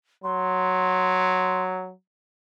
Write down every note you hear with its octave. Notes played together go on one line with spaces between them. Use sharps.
F#3 C6